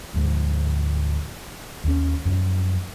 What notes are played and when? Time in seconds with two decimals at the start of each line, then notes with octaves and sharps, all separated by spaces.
0.14 D2 G#2 F3 G#3
1.84 D#2 C#4
2.25 F#2 F3